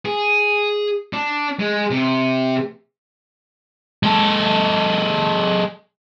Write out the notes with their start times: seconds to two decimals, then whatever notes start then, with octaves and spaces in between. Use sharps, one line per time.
0.05 G#4
1.13 D4
1.59 G#3
1.91 C3
4.03 G#3 A4